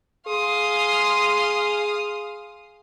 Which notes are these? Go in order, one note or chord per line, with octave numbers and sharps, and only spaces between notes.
G#4 F5 C6 D#6